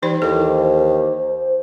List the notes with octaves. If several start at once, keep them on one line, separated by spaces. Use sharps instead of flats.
E3 G3 D#4 C5
D#2 E4 A4
C5